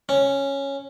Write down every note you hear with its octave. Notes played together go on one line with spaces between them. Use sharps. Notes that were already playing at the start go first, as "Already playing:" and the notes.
C#4